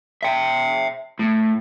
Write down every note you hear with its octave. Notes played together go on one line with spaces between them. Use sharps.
E5 G5
A2